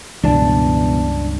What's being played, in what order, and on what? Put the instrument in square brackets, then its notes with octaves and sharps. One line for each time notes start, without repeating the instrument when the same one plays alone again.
[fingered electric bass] C#2 G2 [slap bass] B2 E3 [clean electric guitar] D4 D5 A5